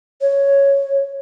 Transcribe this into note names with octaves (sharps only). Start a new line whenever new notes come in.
C#5